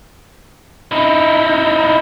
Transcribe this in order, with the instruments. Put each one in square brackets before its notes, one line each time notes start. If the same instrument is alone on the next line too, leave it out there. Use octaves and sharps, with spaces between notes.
[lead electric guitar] D#4 E4